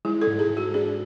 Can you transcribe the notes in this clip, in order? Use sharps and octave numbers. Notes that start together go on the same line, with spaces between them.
G#3 E4
A4
G#2
G#4
G#2
F#4
D4 G#4